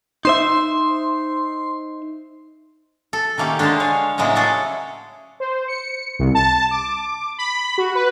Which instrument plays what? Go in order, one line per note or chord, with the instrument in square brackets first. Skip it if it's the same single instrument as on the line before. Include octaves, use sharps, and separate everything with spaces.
[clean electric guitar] D#4 C5 E5 [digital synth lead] C6
[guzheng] A4
D#3 A3 A#3 C#4 G4
D3 G#3 C5 F5 A5
C#5 F5
A2 C#3 F#3 G#3 A#3
G#4 A4 C#5 D5 E5 F#5
[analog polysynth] C5
C#7
C2
A5
D6
B5
F#4
B4